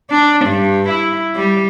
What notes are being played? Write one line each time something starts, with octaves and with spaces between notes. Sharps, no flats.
D4
G2
E4
G3